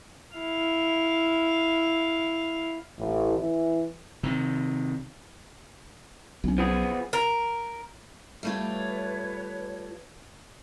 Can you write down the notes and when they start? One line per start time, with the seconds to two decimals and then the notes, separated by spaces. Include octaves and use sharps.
0.36 E4 F5
2.98 A1
3.38 E3
4.23 C3 D#3
6.44 B1 C#4
6.58 F3 B3 G#4
7.13 A#4
8.43 G3 A3 F4 B4 C#5